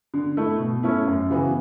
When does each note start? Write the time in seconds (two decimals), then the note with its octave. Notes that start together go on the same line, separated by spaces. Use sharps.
0.14 D3
0.37 A3 E4
0.60 B2
0.83 A3 C#4 E4
1.07 F#2
1.30 C#3 E3 B3 F#4